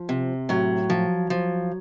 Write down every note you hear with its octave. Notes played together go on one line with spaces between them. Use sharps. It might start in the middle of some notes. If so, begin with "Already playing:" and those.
Already playing: F3
C3
A2 F#3
F3
F3